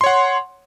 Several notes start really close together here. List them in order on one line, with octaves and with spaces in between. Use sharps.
C6 C#5 F#5